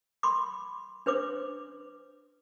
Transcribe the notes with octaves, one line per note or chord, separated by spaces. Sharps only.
B5 C6 D6
D4 B4 C5 D6